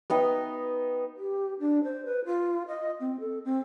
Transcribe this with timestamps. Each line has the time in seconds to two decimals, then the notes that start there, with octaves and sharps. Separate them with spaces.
0.10 B3 D#4 G5
1.17 G4
1.60 D4
1.84 C5
2.05 B4
2.25 F4
2.68 D#5
3.00 C4
3.20 A4
3.45 C4